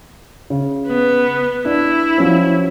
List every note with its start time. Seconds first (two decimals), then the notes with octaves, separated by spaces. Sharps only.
0.50 C#3
0.87 B3
1.65 D4 E4
2.18 F3 F#3 C#4